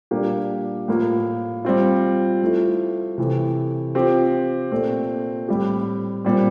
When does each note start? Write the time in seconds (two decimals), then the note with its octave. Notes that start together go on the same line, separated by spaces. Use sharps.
0.11 A#2 G3 A#3 D4 G4
0.88 A2 F3 A#3
1.65 G3 C4 F4
2.42 F3 A3 E4
3.18 C3 E3 A3 C4
3.95 F3 C4 G4
4.72 A#2 A3 C4
5.48 A2 G3 C4 G4
6.24 A#2 G3 C4